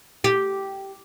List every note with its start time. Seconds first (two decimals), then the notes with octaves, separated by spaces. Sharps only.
0.24 G4